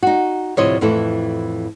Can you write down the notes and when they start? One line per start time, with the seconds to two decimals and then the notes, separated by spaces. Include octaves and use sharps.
0.03 D#4 F#4
0.57 D2 A2 C3 F3 C#5 D#5
0.81 F2 A2 E3 E4 A4